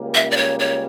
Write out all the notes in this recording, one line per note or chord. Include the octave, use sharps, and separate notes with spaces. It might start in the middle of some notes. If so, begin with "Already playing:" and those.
Already playing: C#2 C#3 G3 A#3
E5
D5
C#5
C#5